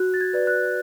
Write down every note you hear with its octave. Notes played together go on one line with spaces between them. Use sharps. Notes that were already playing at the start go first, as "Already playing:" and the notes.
Already playing: F#4 F#6
A6
G#6
B4 D5
F#6